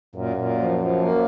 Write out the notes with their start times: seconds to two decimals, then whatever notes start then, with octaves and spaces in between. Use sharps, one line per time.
0.15 F#2 A#2
0.36 A#2
0.58 F3
0.79 F3
1.00 A#3